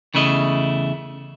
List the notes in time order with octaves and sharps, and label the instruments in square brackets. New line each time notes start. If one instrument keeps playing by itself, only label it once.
[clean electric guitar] E2 C#3 A3 E4 D#5